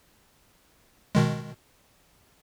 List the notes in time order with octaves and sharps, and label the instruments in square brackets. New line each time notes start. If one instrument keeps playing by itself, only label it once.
[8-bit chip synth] B2 D#3 G#3